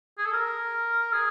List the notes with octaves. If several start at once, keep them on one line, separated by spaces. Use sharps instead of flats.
G#4
A4
A#4
G#4